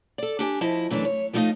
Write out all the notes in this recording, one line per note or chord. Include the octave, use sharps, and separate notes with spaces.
A4 D5
D4 G4 G#5
F3 E4 D#5 A5
F#2 E3 A3 C4 D4
C#5
F3 A3 D#4 F4 D#5 F5